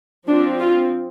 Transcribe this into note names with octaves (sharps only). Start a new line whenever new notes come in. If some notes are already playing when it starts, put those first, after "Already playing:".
F3 C4 D4
F4